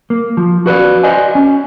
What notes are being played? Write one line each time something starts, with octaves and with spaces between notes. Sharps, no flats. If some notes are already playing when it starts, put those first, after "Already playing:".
A#3
F3
F#4 B4 C5 D5
C5 D5 D#5 G#5
C#4